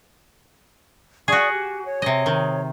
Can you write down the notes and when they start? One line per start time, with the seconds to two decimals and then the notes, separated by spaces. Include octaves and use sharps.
1.28 F#4 G#4 D5 C#6 D#6
1.51 G4
1.85 C#5
2.02 C3 D#5
2.26 D#3